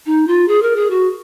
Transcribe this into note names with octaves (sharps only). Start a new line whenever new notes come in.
D#4
F4
G#4
A#4
G#4
F#4